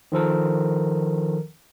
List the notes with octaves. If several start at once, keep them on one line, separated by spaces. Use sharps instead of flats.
D#3 F3 A4 A#4